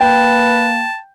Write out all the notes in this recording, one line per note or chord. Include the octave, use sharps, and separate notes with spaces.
A#3 B4 G5 A5